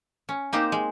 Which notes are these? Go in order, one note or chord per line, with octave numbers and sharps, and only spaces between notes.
C#4
A#3 C4 D#4 G4 C5
G#3